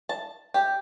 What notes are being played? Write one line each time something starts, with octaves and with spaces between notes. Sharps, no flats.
A5
G4